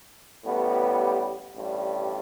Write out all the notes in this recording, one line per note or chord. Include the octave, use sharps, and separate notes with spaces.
A1 A2 G3 B3
G4
A1 G2 G3